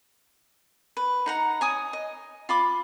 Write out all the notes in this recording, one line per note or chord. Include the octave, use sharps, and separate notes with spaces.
B4
D#4 F#5 A#5
C#5 G#5 D#6
D#5
F4 B5 D6